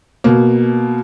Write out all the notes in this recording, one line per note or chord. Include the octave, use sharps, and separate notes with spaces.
B2 A#3